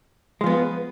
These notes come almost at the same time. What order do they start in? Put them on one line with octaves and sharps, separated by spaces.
G#3 F3 B3